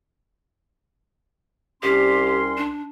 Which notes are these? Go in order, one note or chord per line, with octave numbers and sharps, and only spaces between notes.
C2 C#4 G4 C6
D4